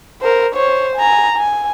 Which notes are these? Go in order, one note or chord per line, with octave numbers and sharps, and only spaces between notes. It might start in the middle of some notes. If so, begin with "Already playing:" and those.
A#4 C5
C5 C#5
G#5 A#5
G#5